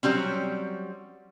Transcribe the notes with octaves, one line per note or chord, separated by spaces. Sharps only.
F#3 G3 C4 C#4